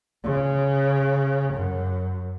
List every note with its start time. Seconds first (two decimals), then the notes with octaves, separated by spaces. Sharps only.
0.24 C#3
1.55 F#2